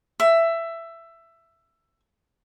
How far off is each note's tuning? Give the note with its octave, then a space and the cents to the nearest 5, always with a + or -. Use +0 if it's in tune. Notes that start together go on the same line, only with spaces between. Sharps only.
E5 +15